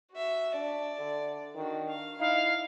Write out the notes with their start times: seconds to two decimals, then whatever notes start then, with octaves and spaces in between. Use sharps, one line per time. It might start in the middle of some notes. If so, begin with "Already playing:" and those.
0.13 F#4 E5
0.54 D4 D5
0.99 D3
1.55 D#3 D4 F#4
1.88 F5
2.20 D#4 E4 F5